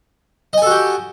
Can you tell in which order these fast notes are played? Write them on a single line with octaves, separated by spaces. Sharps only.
D#5 G#5 A4 F#4 G4